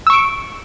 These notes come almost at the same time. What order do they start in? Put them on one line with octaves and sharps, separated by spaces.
E6 C#6 D7